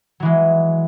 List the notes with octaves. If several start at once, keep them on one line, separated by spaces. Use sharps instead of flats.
E3 F#3 G#3